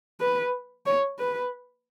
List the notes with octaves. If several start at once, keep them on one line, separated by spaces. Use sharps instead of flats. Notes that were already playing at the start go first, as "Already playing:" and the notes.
B4
C#5
B4